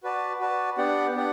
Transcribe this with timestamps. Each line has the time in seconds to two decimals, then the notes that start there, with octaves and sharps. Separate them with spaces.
0.03 F#4 B4 D5 A5
0.40 F#4 B4 D5 A5
0.77 B3 D4 G4 D5 F#5
1.14 B3 D4 G4 D5 F#5